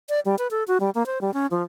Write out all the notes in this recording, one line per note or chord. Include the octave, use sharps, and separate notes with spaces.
D5
G3
B4
A4
F#4
G3
A#3
C5
G3
C#4
F3